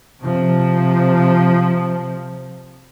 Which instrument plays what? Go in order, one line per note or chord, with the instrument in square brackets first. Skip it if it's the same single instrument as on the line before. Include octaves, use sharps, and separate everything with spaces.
[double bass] C3 F3